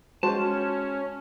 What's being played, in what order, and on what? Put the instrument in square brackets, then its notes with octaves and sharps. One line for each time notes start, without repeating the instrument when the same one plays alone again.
[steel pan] G#3 F#4 C5 [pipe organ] C#4 [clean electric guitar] A5